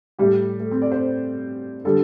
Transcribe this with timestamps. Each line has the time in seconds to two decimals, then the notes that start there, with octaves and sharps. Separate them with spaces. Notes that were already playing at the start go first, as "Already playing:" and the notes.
0.19 A2 G3 G4
0.60 A3
0.71 C4
0.82 D5
0.92 C5
1.85 D3 G3 A4